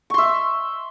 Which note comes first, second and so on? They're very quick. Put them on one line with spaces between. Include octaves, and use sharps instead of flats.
C#6 C6 E5